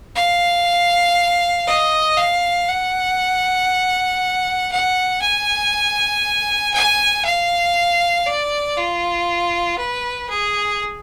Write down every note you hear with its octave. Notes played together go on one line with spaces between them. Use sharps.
F5
D#5
F5
F#5
F#5
G#5
G#5
F5
D5
F4
B4
G#4